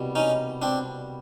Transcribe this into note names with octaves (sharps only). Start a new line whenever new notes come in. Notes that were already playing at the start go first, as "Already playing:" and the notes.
Already playing: C2 B2 G3
C#4 D#4
C4 D4